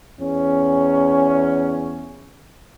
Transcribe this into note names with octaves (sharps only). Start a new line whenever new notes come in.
E2 C#4